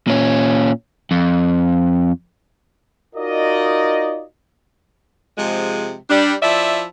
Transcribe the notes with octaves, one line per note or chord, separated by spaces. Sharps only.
A#2 C#4
F2
D#4 F4 F#4 A#4 D5 D#5
C3 F3 G#3
G3 D4
F3 E4 D5 E5